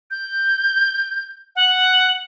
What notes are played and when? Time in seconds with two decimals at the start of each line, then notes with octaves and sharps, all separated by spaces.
0.11 G6
1.56 F#5